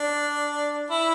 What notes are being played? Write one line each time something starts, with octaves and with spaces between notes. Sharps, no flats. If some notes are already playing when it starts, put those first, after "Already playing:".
Already playing: D4
E4